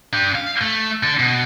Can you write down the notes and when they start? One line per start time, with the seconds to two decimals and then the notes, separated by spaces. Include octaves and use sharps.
0.13 D4 G4
0.35 F5
0.61 A3
1.03 D3 A4
1.19 B2